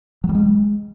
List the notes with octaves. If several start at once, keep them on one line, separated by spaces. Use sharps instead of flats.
F#3
G3
G#3